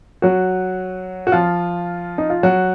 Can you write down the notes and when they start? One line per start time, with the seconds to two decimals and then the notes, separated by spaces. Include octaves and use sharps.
0.22 F#3 F#4
1.27 F#4
1.32 F3 F4
2.18 D#4
2.30 F4
2.43 F#3 F#4